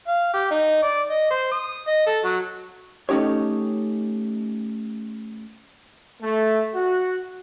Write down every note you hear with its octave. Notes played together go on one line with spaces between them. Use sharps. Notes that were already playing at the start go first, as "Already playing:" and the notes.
F5
G4
D#4
D5
D#5
C5
D#6
D#5
A4
F#3
A3 C#4 D#4 G4 C#5
A3
F#4